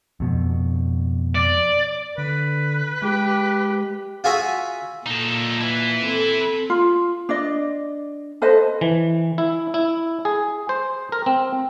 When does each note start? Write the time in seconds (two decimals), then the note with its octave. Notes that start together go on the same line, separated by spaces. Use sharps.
0.20 F2 B2
1.35 D5
2.18 D3 B4
3.02 G#3 G4
4.24 F4 F#4 G#4 E5 G#5
5.06 A#2 D#4 A4
5.61 E4 B4
6.02 C4 A4
6.70 F4
7.29 D4 D5 D#5
8.42 A4 B4 C5 D#5
8.81 E3
9.38 E4
9.74 E4
10.25 G#4
10.69 C5
11.12 A#4
11.26 C4